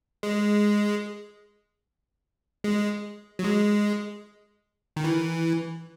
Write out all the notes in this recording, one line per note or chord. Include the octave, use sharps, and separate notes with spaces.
G#3
G#3
F#3
G#3
D#3
E3